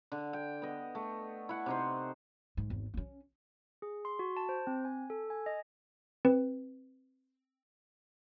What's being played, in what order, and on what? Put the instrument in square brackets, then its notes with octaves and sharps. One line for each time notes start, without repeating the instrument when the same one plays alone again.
[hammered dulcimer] D3
G5
B3 D#5
A3
E4 F#5
C3 D#4 C5
[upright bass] G#2
G#1 E2
C4 C#4
[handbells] G#4
C6
F#4
A5
C5
C4
G#5
A4
G#5
D#5
C4 B4